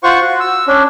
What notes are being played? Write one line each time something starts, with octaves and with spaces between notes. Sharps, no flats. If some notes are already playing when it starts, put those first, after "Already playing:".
F4 C5 F#5 C#6
F#4
E6
C#4 D4